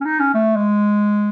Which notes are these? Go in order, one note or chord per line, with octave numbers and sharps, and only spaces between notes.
C#4
D#4
C#4
A3
G#3